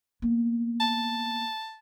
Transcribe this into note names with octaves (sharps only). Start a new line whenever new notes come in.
A#3 B3
A5